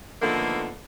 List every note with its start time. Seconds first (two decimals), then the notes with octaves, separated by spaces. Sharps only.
0.22 B2 D3 D#3 F3 A3 A#3